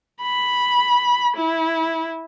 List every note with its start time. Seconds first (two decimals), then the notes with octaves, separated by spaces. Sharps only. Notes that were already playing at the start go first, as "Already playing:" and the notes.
0.22 B5
1.37 E4